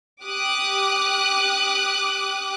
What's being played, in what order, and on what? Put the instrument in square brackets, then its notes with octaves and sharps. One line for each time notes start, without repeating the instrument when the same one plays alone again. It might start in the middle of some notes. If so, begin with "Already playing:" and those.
[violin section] G4 D6 D#6 F#6